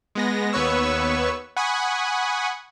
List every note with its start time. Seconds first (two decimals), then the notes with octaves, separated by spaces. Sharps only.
0.15 G#3 B3 A#6
0.53 D#2 B3 B4 C#5 C#6 E6
1.57 F#5 G#5 B5 C#6 D#6